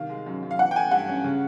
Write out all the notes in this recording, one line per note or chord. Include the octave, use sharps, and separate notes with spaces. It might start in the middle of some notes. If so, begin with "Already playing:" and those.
Already playing: C2 D#3 F5
G#3
F#2
F#2
F5
E3 F#5
G5
A3 G#5
G2 F#5
C#4
C#3